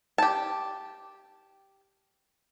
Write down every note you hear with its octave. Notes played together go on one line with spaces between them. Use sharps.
G4 A5